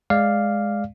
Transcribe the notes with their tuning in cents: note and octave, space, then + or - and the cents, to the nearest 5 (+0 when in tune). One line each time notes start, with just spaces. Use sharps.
G#3 +0 D5 +0 F5 +0